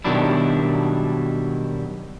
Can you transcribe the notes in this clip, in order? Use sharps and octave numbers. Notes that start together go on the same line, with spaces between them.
B2 D#3 F#3 G3 D4 E4